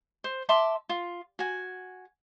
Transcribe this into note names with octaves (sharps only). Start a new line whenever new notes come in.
C5
E5 A5 C6 D6
F4
F#4 G#5